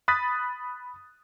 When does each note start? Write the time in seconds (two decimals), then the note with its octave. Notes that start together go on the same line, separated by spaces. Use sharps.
0.08 B5 D#6 F#6 A6 B6